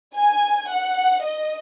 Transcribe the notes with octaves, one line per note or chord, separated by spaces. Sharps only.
G#5
F#5
D#5